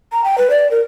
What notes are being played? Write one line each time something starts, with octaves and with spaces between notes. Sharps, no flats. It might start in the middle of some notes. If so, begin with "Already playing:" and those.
A#5
G5
B4
D5
A#4